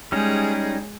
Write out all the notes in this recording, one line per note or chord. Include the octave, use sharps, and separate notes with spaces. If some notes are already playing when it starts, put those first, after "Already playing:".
G3 G#3 C#4 D#4 G#4